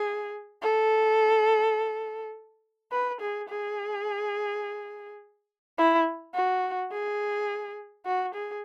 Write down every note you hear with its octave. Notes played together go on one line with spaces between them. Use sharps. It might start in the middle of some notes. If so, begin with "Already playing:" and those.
Already playing: G#4
A4
B4
G#4
G#4
E4
F#4
G#4
F#4
G#4